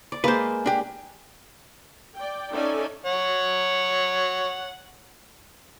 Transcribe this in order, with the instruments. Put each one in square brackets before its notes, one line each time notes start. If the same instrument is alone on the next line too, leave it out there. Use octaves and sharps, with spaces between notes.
[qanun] D5
[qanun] G#3 A#3 [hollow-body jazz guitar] B4 C5
[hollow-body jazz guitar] D4 G4
[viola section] D5 G5
C#4 D#4 A4 D5 E5 G#5
[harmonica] C#5 F#5